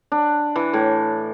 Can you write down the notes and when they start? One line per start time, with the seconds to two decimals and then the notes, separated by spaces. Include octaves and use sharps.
0.12 D4
0.56 E3
0.73 A2